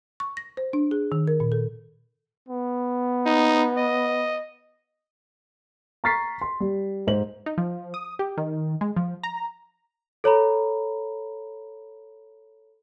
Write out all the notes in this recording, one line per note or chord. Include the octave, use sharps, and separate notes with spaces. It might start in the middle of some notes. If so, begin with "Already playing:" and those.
C#6
A#6
C5
D4
G#4
D#3
A#4
A#2
A4
B3
D#4
D#5
A#5 C#6 F6 A6 B6 C7
C6
G3
G#2 C5 F#7
D#4
F3
D#6
G4
D#3
G#3
F3
A#5
A4 C#5 A#5 B5